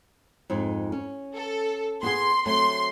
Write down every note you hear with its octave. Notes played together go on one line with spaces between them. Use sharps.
F2 G#2 D#4
C#4
A4
B3 G4 G#4 C6
F#3 A3 C4 C6